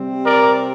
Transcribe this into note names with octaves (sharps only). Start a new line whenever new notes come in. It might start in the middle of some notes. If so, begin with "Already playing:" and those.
Already playing: C3 G3 C4
A#4 D5